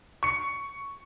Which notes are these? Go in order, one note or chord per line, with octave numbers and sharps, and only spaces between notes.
C#6 C#7